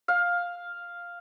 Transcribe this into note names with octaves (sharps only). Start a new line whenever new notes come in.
F5